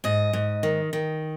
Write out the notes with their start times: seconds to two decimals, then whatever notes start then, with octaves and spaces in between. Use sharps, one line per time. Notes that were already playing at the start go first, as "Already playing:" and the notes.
0.04 G#2 D#5
0.33 G#2
0.63 D#3
0.93 D#3